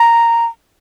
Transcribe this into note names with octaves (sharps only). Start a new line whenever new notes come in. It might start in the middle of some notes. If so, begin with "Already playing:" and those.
Already playing: A#5